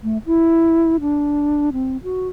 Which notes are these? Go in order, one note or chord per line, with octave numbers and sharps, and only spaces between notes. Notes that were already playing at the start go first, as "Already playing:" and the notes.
A3
E4
D4
C4
F#4